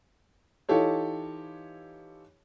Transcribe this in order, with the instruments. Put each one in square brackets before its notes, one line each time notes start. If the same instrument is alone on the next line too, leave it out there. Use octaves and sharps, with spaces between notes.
[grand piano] E3 D#4 F4 G4 A4 C#5